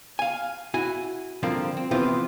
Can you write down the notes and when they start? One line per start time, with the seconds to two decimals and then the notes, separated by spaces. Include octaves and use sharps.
0.19 F5 G#5
0.74 E4 F#4 G#5
1.43 D3 F3 G3 A#3 C4
1.77 C4
1.91 C3 E3 F3 B3 C4 F4